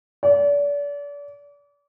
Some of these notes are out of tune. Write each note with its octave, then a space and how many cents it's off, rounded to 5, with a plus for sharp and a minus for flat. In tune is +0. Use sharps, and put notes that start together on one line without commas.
D5 -35